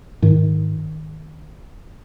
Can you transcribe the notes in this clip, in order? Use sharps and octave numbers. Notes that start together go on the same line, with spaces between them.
G#2 D#3